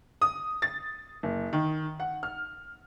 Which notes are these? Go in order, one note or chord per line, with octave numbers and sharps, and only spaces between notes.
D#6
A6
F#1
D#3
F#5
F6